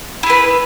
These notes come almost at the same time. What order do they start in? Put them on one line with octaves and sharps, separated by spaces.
E4 G#4 B4